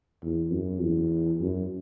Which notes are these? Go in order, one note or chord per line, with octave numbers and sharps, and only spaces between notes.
E2
F#2
E2
F#2